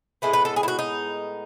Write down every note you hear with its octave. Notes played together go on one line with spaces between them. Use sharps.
A2 G#3 B3 E4
B4
A4
G#4
E4
F#4
D#4